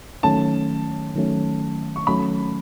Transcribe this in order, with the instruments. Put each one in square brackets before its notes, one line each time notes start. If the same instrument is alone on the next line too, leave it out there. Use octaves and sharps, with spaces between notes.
[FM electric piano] D#3 F#3 A3 C#4 [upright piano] A5
[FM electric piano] D#3 F#3 A3 C#4
[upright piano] C#6
[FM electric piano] D#3 F#3 A3 C#4 [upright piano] B5